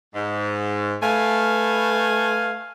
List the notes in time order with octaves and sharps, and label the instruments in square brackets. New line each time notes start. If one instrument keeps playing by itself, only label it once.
[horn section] G#2
[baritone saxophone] A3 [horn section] B4 F5 G#5